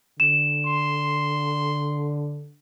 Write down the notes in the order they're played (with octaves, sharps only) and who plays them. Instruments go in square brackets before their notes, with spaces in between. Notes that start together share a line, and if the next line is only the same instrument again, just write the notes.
[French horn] D3 [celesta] E7
[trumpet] C6